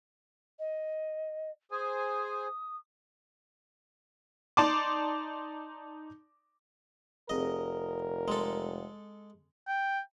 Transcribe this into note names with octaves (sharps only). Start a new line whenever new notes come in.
D#5
G#4 C5 G#5 D#6
D#4 D5 A5 C6 D6
F1 C4 G#4 A#4 D#5
G#3 A4 C6
G5